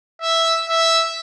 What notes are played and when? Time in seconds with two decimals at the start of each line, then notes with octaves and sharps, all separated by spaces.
0.22 E5
0.69 E5